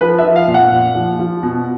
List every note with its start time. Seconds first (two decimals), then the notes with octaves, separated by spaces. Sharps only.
0.01 F3 B4
0.18 E5
0.24 F3
0.36 F5
0.48 A#2
0.54 F#5
0.72 A#2
0.95 F3
1.19 F3
1.43 B2